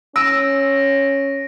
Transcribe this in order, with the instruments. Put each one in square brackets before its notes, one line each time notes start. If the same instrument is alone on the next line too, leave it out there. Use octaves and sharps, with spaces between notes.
[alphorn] C#4 [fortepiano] E6 [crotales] A#6 D7 D#7